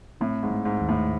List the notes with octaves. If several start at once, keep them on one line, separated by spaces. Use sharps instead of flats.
A2 C4
G#2
A3
G#2
D#2
A2